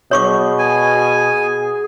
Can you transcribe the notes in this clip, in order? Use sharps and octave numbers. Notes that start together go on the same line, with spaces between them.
B2 G#4 C#5 C#6 D6
G#5